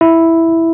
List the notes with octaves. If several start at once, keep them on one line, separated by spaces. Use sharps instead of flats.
E4